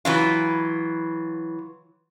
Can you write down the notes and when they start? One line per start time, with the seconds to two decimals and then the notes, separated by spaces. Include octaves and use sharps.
0.05 E3 F#3 F4